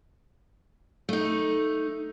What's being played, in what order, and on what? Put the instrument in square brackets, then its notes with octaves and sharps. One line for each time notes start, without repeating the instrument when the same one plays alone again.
[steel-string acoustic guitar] A3 D#4